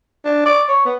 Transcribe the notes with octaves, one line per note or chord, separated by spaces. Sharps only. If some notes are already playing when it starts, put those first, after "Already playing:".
D4
D5
C#5
B3